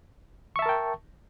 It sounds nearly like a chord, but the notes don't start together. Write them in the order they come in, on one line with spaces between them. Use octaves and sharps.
C#6 E5 A5 A#4 G5